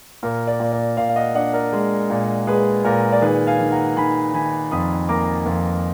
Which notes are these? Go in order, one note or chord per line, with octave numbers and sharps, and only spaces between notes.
A#2 A#4
A#4 D5
A#2
A#4 D5
A#2 D5 F5
F5
D#5 F#5
D4 D#5 F#5
A#4 D5
G#3
A#2
G#3 G#4 B4
A#2 A#4
D5
D#3 G#4 B4
F5 G#5
D#3
F#5 A#5
D#3 G#5 B5
D#3 G#5 B5
F2 B5 D#6
A#3 A#5 D6
F2